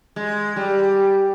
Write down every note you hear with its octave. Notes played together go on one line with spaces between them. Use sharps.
G#3
G3